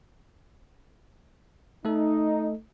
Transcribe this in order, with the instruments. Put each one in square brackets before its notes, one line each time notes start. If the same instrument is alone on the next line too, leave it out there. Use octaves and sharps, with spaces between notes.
[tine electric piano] A3 A4 [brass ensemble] D#4